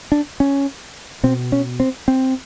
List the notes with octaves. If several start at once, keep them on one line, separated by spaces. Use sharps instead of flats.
D4
C#4
B2 C4
C#4
C4
C4